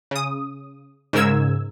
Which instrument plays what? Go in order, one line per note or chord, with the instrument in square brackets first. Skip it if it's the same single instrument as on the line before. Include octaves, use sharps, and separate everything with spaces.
[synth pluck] C#3 D#6
G#2 C#3 A#4 E6 G#6